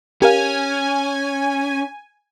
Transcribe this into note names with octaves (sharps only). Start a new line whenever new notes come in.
C#4 G4 A#4 F5 G#5